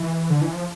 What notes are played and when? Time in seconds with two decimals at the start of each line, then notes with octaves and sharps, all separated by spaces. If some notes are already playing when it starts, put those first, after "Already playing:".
Already playing: E3
0.30 D3
0.41 E3
0.52 F3